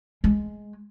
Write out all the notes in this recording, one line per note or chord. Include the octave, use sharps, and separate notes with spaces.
G#3